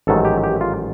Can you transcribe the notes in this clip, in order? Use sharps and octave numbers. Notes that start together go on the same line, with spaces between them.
A1 G#2 D#3 F#3 A4
G4
G4
F4